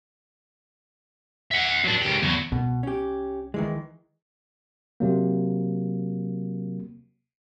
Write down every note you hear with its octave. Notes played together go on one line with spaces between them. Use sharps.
E5 F#5
F#3 D4
C#2 G4
E2 F#3
C2 B2
C#4 G4
D#3 E3 G#3
C3 F#3 A#3